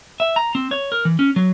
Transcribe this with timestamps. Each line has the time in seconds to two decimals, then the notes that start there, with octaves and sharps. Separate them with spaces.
0.20 E5
0.36 A#5
0.55 C4
0.71 C#5
0.92 A#4
1.05 E3
1.19 C#4
1.36 F#3